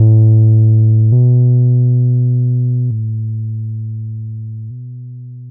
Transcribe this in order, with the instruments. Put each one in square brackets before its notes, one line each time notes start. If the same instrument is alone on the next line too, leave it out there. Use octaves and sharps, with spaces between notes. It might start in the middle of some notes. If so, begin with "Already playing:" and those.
Already playing: [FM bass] A2
B2
A2
B2